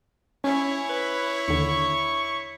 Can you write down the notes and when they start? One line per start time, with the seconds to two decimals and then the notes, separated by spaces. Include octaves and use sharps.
0.44 C#4 E4 C#5 G#5
0.89 B4
1.48 D#2 D3 C#6